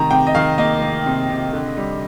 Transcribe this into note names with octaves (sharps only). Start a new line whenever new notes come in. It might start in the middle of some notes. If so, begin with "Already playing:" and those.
Already playing: C3 D#3 A#5
C3 G5
D#5
D#3 F5
A#3 D#5
A#3
C3
C3
D3
G3